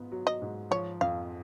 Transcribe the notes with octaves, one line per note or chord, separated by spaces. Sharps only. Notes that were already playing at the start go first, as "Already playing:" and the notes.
Already playing: G#2 B3 F4
F#3
D#5
G#2
F3 C#5
F2 F5